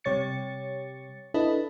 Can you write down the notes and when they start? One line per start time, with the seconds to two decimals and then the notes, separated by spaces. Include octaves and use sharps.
0.04 C3 G3 C#5 A6 C#7
1.34 D4 E4 A4 B4 D#5